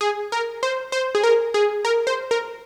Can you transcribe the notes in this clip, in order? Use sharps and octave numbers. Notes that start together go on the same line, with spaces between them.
G#4
A#4
C5
C5
G#4
A#4
G#4
A#4
C5
A#4